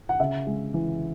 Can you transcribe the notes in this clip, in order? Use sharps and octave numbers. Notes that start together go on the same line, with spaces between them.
F#5
C#3 E5
G#3
E3